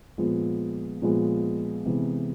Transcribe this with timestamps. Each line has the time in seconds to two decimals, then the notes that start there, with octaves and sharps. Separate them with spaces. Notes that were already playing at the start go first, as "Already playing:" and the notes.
0.18 A#2 F3 G#3 B3
1.02 A#2 F3 G#3 B3
1.85 C3 E3 G#3 B3